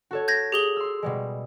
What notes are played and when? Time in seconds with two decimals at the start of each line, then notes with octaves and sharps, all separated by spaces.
0.11 F#4 A4 C#5
0.28 G6 G#6 A#6
0.52 G4 G#4 G7
0.76 C6 E6
1.03 B2 G3 G#3